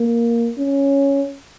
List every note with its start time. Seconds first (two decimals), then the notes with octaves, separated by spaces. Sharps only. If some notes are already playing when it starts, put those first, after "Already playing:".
Already playing: A#3
0.59 C#4